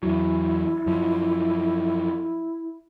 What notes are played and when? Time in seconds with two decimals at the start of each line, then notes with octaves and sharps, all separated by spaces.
0.03 E2 F#3 E4
0.86 F#2 F3